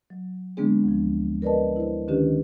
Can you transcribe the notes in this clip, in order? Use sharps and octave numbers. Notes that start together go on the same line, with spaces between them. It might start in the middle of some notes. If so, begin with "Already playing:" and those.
F#3
D3 G#3 B3 C4 D4 G#4
D2 F3
A#4 B4 D5 D#5 A5
E4 C5
D3 D#3 C#4 D4 G4 B4